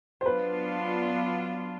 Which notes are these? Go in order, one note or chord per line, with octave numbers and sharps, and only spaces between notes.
C5
F#3 B3 D4 F4 B4